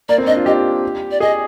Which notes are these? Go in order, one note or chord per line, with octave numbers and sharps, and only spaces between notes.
A#3 D5
C4
D4 D#5
F4
G4 D#5
D5
G#4 D#5